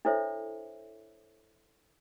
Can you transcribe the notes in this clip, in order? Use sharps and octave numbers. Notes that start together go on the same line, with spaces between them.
D4 E4 A4 C5 C#5 E5